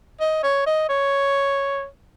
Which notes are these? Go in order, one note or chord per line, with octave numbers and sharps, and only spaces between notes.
D#5
C#5
D#5
C#5